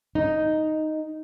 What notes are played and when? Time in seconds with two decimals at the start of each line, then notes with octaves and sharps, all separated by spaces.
0.15 D#4